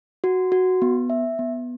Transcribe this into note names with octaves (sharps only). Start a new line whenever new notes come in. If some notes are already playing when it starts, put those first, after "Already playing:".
F#4
F#4
B3
E5
B3